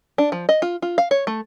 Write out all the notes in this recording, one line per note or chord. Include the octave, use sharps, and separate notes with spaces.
D4
F3
D#5
F4
F4
F5
C#5
A3